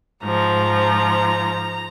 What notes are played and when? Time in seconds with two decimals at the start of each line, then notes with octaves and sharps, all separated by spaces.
0.23 G#2 F3 A#5